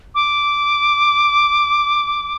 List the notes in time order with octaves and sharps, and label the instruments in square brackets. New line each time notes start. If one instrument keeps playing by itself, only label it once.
[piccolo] D6